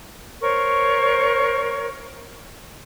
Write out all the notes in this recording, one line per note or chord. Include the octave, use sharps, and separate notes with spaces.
A#4 C5 C#5 C#6